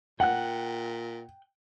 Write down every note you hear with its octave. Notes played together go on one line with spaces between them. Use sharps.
A#2 F#5 G5 F#6